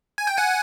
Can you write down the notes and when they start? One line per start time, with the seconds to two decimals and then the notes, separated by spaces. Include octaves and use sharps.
0.18 G#5
0.27 G5
0.38 F#5 G#5